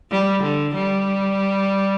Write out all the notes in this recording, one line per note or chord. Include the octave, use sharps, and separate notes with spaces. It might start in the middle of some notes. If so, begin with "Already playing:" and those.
G3
D3
G3